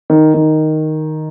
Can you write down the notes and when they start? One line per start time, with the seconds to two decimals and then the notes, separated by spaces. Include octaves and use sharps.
0.10 D#3
0.34 D#3